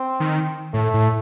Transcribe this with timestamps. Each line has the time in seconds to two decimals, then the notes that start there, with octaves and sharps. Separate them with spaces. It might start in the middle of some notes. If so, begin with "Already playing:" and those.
Already playing: C4
0.20 D#3
0.73 A2 A3
0.94 A2